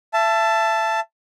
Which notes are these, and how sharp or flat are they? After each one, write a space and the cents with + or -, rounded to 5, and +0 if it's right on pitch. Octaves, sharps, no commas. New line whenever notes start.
E5 +30 A5 +0